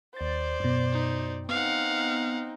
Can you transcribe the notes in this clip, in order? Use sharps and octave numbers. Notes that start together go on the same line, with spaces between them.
D#2 C5 D5 A6
F#2 B2
D#4
B3 C4 D#4 F5 F#5